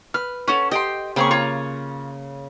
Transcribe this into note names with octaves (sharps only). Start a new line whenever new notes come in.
B4 F6
C#4 A4 F#5 G#5
G4 D#5 G5 C6
C#3 A#3 C4 G4 G#4 C#6
F4 C#5 C#6